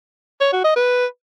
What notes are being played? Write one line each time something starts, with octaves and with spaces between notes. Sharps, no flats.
C#5
F#4
D#5
B4